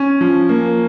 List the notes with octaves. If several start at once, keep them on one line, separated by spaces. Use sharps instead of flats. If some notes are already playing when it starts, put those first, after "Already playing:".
Already playing: C#4
F3
A#3